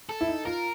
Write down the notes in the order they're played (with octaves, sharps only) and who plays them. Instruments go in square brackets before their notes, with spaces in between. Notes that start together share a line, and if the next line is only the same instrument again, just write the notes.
[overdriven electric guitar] A4
[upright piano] E4
D#4
[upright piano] F4 [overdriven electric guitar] A#4